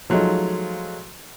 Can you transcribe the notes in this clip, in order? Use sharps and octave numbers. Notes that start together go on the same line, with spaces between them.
F3 F#3 G#3 A3 D#4 F4